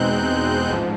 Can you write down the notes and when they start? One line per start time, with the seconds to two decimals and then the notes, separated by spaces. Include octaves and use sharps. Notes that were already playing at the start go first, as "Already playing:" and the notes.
Already playing: E2 B2 G#3 C4 D#4 F#6 G6
0.69 A1 G#2 F3